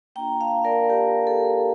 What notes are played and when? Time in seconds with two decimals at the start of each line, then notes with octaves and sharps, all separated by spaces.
0.16 A#3 D4 F4 G5 A#5
0.40 F5 A5
0.65 A#4 D5
0.90 G4 A#4
1.27 A4